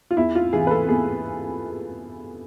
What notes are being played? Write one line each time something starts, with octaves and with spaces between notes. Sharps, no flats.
F4
E2 E4
F4
C3 E3 G#4
B4
A4
E2 G#4